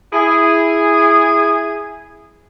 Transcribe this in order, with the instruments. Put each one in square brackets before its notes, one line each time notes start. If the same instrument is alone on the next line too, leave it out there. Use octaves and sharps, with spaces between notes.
[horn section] E4 G#4